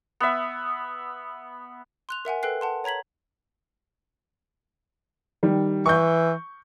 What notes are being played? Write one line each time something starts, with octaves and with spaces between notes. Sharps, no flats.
B3 E5
C6 F#6 F7
A#4 E5 F#5 G#5
A4 B4 G5 F#6 C7
F#5 A5 C6
C#5 A#5 G#6 B6 F#7
D#3 G3
E3 C#6 G6